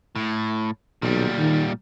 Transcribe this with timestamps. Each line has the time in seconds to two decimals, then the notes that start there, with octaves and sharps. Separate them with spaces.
0.15 A2
1.02 B1 A#2 G3
1.39 D#3